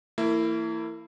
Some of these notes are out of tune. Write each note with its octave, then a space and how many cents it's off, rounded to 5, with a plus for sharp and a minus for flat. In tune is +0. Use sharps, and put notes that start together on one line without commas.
E3 +0 A#3 -40 E4 +10